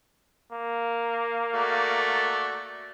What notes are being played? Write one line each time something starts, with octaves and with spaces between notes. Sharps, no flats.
A#3
A3 F#4 D5